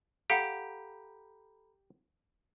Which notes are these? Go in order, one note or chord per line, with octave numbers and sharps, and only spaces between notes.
G4 A4 F5 F#5 A#5 B5